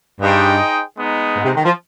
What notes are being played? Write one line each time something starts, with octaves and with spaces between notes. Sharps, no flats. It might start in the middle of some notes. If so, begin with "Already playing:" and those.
G2 D#4 G#4 C5 D#5 G5
G#3 B3 D#4
G#2
C3
D#3
F3